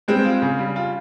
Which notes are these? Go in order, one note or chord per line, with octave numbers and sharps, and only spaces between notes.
G3 G#3 C4
F4
C#3
G3
F4